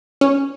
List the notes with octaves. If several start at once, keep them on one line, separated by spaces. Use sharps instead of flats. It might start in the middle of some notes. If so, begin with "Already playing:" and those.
C#4